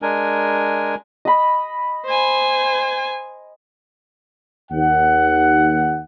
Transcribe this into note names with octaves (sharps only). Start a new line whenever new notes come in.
G#3 D4 A#4 G#5
D#5 B5
C5 G#5
D#2 F#5